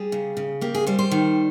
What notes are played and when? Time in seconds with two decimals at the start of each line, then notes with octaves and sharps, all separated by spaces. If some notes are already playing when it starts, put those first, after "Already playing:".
Already playing: G3 G#4
0.12 C#3
0.37 C#3
0.61 A#3 G4
0.75 G#4
0.87 G3 C5
0.99 C5
1.11 D#3